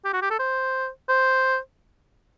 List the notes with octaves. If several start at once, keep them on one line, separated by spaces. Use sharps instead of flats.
G4
F#4
G4
A4
C5
C5